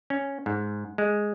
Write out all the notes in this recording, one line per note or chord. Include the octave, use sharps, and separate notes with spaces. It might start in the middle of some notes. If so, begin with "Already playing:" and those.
C#4
G#2
G#3